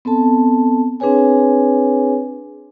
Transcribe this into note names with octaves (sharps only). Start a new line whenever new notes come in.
B3 C4 A4 A5
C4 D4 G#4 B4 C#5 G#5